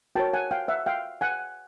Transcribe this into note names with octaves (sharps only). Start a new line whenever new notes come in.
F#4 A#4 C#5 G5 A5
F#5 G#5
F5 G5
E5 F#5
F5 G5
F#5 G#5